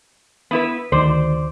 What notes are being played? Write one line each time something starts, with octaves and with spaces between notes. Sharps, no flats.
B3 E4 B4
D2 D#3 C5 D5